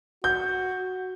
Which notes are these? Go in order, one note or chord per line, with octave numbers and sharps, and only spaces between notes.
F#4 G6